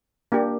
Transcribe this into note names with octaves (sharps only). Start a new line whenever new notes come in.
A#3 D4 G4